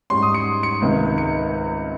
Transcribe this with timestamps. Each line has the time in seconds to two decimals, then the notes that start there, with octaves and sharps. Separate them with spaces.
0.10 G#2 G3 C#4 C6
0.22 D#6
0.34 C#7
0.63 C#7
0.82 C#2 C3 D#3
1.18 C#7